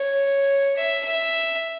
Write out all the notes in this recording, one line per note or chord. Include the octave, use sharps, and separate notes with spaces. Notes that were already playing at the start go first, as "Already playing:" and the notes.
Already playing: C#5
E5
E5